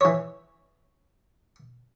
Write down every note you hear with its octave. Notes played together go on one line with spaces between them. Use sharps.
E3 C#5